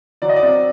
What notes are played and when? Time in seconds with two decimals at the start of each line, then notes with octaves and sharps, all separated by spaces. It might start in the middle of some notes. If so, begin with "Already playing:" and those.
0.22 F#3 D5
0.29 D#5
0.36 D5
0.43 C4